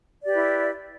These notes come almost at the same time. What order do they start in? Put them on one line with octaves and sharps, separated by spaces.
D5 G4 B4 E4